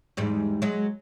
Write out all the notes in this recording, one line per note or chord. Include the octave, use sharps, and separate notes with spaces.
E2 G#2 G3
F#3 G#3